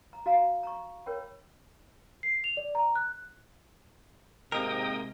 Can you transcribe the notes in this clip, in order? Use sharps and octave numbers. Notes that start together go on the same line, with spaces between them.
A#5
F#4 F5 A#5
A#5 C#6
A#4 C#5 G5 B5
C7
F7
D5
A#5
F#6
G#2 C3 G#3 A#3 A#4 D#5 G5 D#6